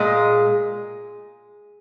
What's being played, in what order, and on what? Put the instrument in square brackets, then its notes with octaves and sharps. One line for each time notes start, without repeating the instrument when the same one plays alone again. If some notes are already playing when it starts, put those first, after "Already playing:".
Already playing: [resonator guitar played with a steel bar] A#2 G#3 G#4